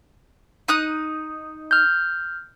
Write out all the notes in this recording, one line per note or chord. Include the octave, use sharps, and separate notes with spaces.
D#4 D#6 F#6
F6 G6